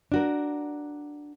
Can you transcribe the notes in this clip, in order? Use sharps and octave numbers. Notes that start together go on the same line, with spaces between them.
D4 F#4 A#4